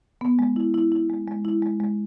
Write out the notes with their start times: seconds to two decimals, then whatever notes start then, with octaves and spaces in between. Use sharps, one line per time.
0.21 B3
0.39 G#3
0.56 E4
0.74 E4
0.92 E4
1.10 G#3
1.27 G#3
1.45 E4
1.62 G#3
1.80 G#3